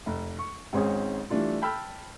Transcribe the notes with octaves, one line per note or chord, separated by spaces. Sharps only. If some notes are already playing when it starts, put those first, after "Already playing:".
F1
C#6
G#1 G#2 C4 C#4 G#4
E3 G3 A3 D4 F4
G5 A5 B5 E6 F6 G6